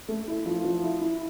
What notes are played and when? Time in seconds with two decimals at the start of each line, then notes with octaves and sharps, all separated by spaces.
0.08 A3
0.28 E4
0.46 F3
0.64 F3
0.83 E4
1.01 E4